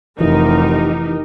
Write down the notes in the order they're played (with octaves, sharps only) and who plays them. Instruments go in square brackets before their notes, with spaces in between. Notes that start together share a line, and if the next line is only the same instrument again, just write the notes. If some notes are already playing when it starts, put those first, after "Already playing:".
[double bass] F1 [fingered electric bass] E3 [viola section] D#4 G4 A#4